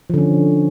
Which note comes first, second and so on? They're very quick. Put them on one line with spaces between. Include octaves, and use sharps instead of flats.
F3 D3 C#4